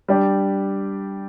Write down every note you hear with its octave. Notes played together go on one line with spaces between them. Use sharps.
G3 D4 G4